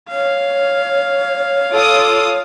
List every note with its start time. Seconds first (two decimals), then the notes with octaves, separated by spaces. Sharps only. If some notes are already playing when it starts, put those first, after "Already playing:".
0.11 C#5 F5
1.74 F4 A4 D6 D#6